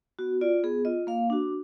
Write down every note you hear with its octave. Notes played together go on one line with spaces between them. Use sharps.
B3 F#4
F4 D5
B3 G#4
F4 D#5
A#3 F5
D4 F#4